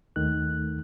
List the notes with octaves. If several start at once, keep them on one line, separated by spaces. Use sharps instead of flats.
D#2 D#3 A3 F#6